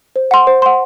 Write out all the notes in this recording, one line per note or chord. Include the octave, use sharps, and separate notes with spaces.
C5
F#5 C6
C5
F#5 C6